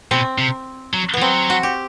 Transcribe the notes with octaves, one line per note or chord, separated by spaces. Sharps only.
B2 C4
C3
F#3
E3 B3
F#3 C4
F#4
G4